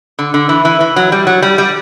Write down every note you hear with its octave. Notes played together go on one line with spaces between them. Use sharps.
D3
D3
E3
E3
E3
F#3
G3
F#3
G3
G3